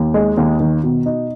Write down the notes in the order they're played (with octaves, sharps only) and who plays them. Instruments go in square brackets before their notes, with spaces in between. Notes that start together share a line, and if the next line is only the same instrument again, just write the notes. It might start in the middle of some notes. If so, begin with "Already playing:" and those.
Already playing: [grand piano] D#2
G#3
D#2
D#3
B2
D#4